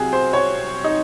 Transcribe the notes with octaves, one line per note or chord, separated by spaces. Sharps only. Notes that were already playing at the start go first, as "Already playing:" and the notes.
Already playing: C2 C3 F#3 F#4 G#4
C5
C#5
D#4